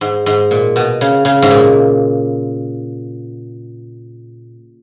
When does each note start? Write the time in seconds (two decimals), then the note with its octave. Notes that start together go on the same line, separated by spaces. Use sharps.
0.01 G#2
0.26 G#2
0.51 A#2
0.76 B2
1.01 C#3
1.25 C#3
1.42 G#2
1.51 A#2